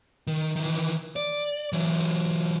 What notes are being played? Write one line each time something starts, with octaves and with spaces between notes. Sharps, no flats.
D#3
D#3 E3
D5
E3 F#3